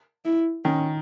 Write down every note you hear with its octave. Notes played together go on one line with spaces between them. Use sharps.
E4
D#3 C#4